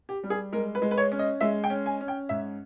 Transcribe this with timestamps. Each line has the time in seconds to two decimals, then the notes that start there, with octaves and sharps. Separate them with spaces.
0.09 G4
0.24 G3
0.30 G#4
0.53 G#3 A#4
0.75 B4
0.82 G#3
0.91 B4
0.98 C#5
1.12 C#4
1.19 D#5
1.41 G#3 E5
1.64 G5
1.70 C#4
1.86 G#5
2.01 C#4
2.08 G5
2.29 G#2 E5